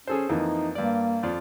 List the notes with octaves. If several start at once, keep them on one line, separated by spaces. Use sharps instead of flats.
C#4 G#4 A4 C5
F2 E3 A#3 D#4
G2 A#3 D5
F2 F4 D5